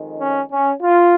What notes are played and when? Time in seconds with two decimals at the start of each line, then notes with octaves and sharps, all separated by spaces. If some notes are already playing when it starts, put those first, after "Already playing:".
Already playing: F2 D#3 G#3
0.20 C#4
0.51 C#4
0.81 F4